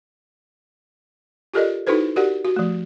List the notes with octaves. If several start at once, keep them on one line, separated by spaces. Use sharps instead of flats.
F4 G4 A4 A#4 D5 D#5
D#4 E4 F#4 A4 B4 C5
F#4 G4 A#4 D5 F#5
F#4
F3 A3